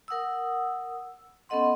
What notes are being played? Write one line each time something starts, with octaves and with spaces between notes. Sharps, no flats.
A#4 F#5 D#6 E6
B3 C#4 A4 D#5 F#5 C6